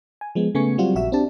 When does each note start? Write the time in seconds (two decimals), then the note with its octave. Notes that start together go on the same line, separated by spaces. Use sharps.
0.21 G#5
0.35 F3 G#3 B3
0.55 C#3 A3 B3 G#5 C#6 C#7
0.78 F#3 G3 C4 F4 F#4
0.95 A#1 F#4 E5 E6
1.12 C4 D4 G4 A5